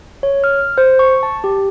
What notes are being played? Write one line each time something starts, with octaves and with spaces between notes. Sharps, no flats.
C#5
F6
C5
C#6
A5
G4